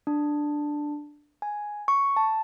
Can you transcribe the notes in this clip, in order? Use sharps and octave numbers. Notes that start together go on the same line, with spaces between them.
D4
G#5
C#6
A5